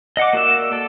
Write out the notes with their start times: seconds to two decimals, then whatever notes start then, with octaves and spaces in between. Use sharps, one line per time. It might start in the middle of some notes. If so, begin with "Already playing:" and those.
0.17 D#5 F#5 D6
0.33 A#3 F#4 D5 E5
0.72 A4 D5